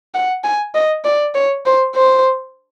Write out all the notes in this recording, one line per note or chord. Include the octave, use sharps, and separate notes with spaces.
F#5
G#5
D#5
D5
C#5
C5
C5